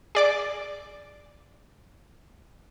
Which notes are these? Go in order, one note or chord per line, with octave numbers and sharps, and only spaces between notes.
G#4 D5 D6